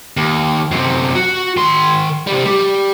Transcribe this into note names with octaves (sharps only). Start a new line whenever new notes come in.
D#2
F#2 C3
F#4
D#3 C6
C3 G3
G3 G4